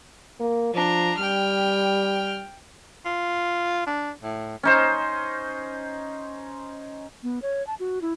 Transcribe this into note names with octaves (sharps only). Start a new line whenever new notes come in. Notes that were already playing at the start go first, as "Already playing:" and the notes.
A#3
F3 D4 A#5
G3 G5 F6
F4
D4
A2
C#4 D#4 C5
B3
C#5
A5
F#4
E4